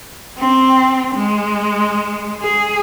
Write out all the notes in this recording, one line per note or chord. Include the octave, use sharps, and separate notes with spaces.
C4
G#3
G#4